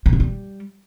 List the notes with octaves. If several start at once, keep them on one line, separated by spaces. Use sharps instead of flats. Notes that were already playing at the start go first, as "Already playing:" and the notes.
B2
D3
G3